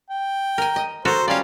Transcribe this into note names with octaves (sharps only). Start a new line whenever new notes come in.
G5
A#4 G#5
D#5
F#4 A4 A#4 C5
G3 C#4 F4 D5 F5